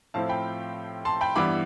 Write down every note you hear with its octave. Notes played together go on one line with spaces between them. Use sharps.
A2 F3 C4 E4 F5 A5
G5 B5
A5 C6
G5 B5
G2 E3 G3 B3 E4 B5 D6